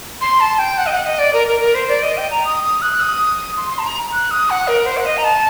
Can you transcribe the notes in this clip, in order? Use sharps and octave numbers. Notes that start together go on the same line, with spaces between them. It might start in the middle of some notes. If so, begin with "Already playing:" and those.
C6
A5
G5
F#5
D#5
F#5
D#5
D5
A#4
A#4
A#4
C5
D5
D#5
G5
A#5
D#6
D#6
F#6
D#6
C6
C6
A5
A#5
F#6
D#6
F#5
A#4
C5
F#5
D#5
A#5
A5